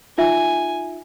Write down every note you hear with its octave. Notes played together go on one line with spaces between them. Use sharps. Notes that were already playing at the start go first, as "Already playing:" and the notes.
D#4 F4 E5 G#5